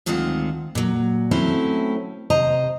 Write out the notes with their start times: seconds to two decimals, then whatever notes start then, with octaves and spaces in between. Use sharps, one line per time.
0.06 D2 G#2 D#3 C4 F4 F#5
0.75 A#2 F#3
1.31 F#3 A3 C4 C#4 E4
2.30 C3 C5 D#5 A#5